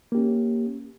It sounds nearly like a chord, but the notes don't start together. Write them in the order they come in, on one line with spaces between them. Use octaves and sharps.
A#3 G4 C#4